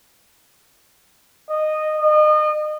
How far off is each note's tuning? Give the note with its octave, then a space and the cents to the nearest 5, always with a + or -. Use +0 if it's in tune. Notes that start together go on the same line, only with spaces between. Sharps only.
D#5 -10
D#5 -35